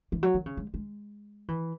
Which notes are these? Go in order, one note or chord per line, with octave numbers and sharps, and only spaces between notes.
E3
F#3
D#3
C#3
G#3
G#3
E3